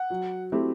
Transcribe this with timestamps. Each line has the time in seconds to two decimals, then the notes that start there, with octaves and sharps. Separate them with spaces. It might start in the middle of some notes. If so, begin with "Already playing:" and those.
Already playing: F#5
0.10 F#3
0.52 A3 C4 E4 G4